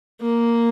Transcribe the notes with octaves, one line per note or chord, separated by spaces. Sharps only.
A#3